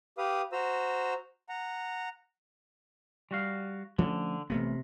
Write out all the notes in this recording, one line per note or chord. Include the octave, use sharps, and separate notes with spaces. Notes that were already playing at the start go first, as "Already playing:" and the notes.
G4 B4 F5 D#6
F#4 C5 A#5 E6
F#5 A#5
G3 F#4 F5
D3 F3 A3 C#4
A1 C3 A3 B3